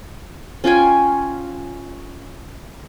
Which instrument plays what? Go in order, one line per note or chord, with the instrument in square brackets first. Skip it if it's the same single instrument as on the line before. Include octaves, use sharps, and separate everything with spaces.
[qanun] C#4 F4 G5 G#5